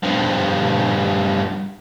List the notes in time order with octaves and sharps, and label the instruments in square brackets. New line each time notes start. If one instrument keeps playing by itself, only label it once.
[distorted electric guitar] G2 F3